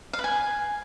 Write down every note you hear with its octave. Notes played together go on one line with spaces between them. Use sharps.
F5
B4
G#5